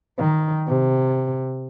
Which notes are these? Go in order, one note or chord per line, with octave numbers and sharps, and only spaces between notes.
D#3
C3